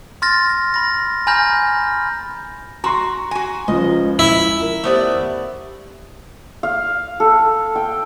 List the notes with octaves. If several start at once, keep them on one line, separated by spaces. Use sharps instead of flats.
C6 F6 A6 A#6
B5 A#6
G#5 A#5 B5 F6 G6 A#6
F#4 A#5 C6 C#6
F#4 G#5
C#2 F3 C#4 F4 D#5
E4
A#4
A3 B3 G4 C5 D5 E5
F5
A4
G5